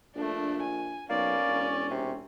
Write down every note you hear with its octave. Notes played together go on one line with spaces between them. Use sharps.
A#1 A3 D4
G#5
B1 A#3 C#4 D5
E1
C3